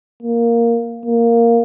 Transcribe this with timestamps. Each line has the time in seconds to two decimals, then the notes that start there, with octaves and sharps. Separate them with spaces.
0.23 A#3
1.06 A#3